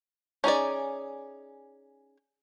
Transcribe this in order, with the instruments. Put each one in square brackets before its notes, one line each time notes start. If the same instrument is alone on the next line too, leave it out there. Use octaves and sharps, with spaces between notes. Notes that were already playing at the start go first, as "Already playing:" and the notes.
[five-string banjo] C#4 D#4 G#4 D5